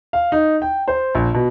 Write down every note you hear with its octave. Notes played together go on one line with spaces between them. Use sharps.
F5
D#4
G5
C5
A#1
B2